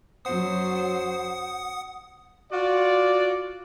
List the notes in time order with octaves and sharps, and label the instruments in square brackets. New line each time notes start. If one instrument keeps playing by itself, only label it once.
[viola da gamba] F#2 F#3 C5 [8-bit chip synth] F#5 D#6
[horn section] F4 F#4 D5